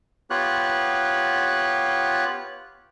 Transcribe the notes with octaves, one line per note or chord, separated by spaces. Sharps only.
B3 F4 G4 C#5 F#6